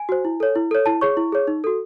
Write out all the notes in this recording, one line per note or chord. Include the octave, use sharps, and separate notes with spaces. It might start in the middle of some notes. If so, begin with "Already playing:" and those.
Already playing: G#5
F#4 C5
E4
A4 C#5
E4
A4 C#5
E4 A5
G#4 C#5 C#6
E4
G#4 C#5
D#4
F#4 A4